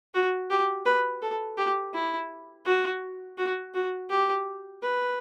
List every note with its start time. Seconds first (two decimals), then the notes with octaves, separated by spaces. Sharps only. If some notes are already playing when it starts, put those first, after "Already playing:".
0.14 F#4
0.50 G4
0.85 B4
1.22 A4
1.57 G4
1.94 E4
2.66 F#4
3.38 F#4
3.74 F#4
4.09 G4
4.82 B4